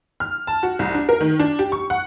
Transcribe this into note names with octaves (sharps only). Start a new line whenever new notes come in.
F6
A5
F#4
C2
D4
A#4
D#3
D4
G4
C#6
F#5